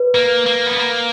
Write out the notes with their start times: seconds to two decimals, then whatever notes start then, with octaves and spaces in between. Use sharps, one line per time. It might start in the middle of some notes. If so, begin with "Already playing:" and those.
Already playing: B4
0.15 A#3
0.46 A#3
0.67 B3
0.78 A#3